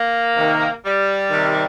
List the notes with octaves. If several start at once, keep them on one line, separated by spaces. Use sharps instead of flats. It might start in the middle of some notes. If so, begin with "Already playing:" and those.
Already playing: A#3
C3 D#3
G3
C3 D#3